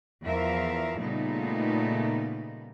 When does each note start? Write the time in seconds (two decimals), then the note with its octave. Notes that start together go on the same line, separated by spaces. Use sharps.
0.23 E2 F3 A#4 E5 F5
0.99 A#2 C#3 G3 A3 B3 D#4